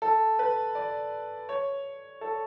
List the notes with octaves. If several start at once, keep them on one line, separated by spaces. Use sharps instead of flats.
A4
B4
D5
C#5
A4